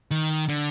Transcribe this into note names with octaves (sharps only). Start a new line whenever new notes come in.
D#3
D3